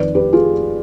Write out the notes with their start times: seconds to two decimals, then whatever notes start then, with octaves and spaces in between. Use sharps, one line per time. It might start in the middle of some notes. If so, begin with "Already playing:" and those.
Already playing: F2 D#3 B4 D5
0.15 G4 B4
0.33 F4 G#4